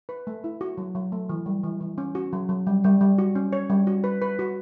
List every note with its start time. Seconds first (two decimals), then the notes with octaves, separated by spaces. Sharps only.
0.09 B4
0.27 A3
0.44 E4
0.61 F#4
0.78 F#3
0.95 F#3
1.12 A3
1.29 E3
1.46 G3
1.64 E3
1.81 E3
1.98 C#4
2.15 F#4
2.33 F#3
2.49 F#3
2.67 G3
2.84 G3
3.01 G3
3.18 F#4
3.35 C#4
3.53 C#5
3.70 G3
3.87 F#4
4.04 B4
4.22 B4
4.39 F#4